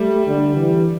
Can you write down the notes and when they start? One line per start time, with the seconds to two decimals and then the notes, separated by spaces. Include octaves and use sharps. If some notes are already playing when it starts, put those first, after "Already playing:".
Already playing: G3 A3
0.27 D3
0.56 E3